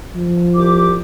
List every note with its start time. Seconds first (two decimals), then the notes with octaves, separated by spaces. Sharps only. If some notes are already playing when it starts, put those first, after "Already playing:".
0.15 F3
0.56 C2 G4 D6